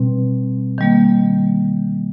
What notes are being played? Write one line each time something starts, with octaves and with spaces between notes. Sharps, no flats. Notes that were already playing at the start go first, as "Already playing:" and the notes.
Already playing: B2 G3 C4
D#3 G3 A#3